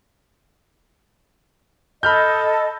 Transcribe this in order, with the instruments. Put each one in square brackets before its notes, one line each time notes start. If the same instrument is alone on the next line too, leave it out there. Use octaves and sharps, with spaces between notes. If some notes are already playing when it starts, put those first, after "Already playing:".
[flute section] A4 D#5 [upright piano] B5 F6 G6